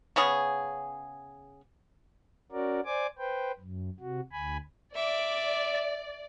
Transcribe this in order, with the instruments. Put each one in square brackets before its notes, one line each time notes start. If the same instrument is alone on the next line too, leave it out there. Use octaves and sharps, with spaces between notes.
[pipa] C#3 B3 C#4 G#4
[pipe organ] C#4 F#4 A#4 D5
C5 D5 G#5 D6
B4 C5 G5
F#2
C3 F#4
D2 G#5 B5
[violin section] D5 [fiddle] E5 D6